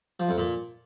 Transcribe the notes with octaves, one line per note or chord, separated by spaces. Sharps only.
F3
F2
A#2